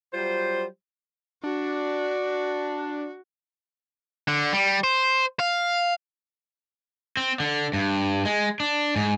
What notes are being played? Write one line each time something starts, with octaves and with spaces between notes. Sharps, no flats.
F#3 G3 F4 C5
D4 F#4
D3
G3
C5
F5
C4
D3
G2
G#3
D4
G#2